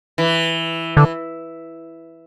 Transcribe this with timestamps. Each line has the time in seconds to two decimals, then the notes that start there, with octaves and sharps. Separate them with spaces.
0.18 E3
0.97 D3 E3